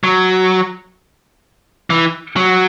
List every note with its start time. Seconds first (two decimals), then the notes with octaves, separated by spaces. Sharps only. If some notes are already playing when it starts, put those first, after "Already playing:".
0.04 F#3
1.90 E3
2.36 F#3